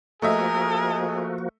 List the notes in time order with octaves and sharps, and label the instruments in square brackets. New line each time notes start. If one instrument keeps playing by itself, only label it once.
[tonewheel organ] F3 A#3 F#4 [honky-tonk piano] A3 D#5 E5 [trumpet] G#4 [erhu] A#4